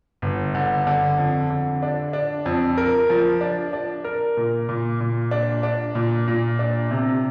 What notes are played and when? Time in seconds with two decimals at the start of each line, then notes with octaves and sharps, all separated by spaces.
0.22 G1
0.55 D3
0.87 D3
1.18 F2
1.50 D3
1.83 D4
2.13 D4
2.46 F2
2.77 A#4
3.10 F3
3.41 D4
3.73 D4
4.04 A#4
4.37 A#2
4.69 A#2
5.01 A#2
5.31 D4
5.63 D4
5.95 A#2
6.28 A#2
6.59 D4
6.91 C3